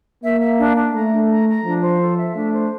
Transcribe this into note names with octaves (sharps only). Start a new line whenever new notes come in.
A#3 E5
E5
D4
D4
A3 A#5
D4
A#5
A#5
F3 D4
C5
A4
E5
A3 D4
C5